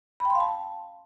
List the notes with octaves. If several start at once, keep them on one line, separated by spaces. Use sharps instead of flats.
B5
G5
C6
F5
A5